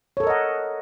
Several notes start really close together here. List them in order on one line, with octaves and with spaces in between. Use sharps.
C#5 A4 A#4 D#5 F#5